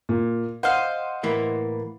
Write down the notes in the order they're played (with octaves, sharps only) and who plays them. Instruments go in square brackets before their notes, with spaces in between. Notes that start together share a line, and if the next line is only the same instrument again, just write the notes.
[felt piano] A#2
[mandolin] C5 D#5 F5 [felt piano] F#5
[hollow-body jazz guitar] A2 E3 A#3